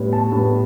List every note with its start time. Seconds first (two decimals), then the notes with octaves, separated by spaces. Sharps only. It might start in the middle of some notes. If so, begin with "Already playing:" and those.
Already playing: A2 G3 B3
0.13 A5
0.32 A2 G3 B3